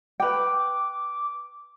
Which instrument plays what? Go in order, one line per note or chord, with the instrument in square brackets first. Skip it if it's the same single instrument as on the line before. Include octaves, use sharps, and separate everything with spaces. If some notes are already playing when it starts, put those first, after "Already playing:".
[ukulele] B4 G5 [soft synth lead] D6